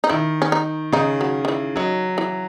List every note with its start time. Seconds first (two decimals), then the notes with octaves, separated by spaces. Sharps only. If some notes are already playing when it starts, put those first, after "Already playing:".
0.04 D#4
0.09 D#3 E4
0.42 C#4
0.52 D#4
0.93 C#3 D#4
1.21 F#3
1.45 D#3
1.48 E3
1.76 D#3 F#3
2.18 E3